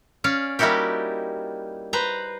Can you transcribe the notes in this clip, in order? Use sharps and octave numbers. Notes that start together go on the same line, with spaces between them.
C#4 D5 F5
G3 A#3 D#4 E4 F#4 G4
B4 C5 A#5